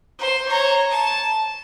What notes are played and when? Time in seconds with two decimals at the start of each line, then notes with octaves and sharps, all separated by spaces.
0.19 C5
0.48 C#5 A#5
0.91 A5